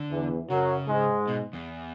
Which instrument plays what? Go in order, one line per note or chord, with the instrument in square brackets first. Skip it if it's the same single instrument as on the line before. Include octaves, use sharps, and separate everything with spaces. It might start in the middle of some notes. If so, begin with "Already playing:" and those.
Already playing: [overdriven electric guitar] D3
[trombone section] E2 E3
[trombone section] F#2 F#3 [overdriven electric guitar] C#3
[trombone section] G#2 G#3
[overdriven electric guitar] B2
E2